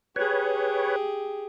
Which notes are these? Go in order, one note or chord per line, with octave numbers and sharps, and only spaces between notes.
G4 G#4 B4 C#5